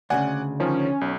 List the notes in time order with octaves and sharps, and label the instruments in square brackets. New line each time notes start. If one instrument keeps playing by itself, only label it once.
[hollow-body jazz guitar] D2 A#2 C#3 [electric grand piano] D5 F#5 G#5
[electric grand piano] D#3 F3 [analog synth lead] C#4
[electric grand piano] B1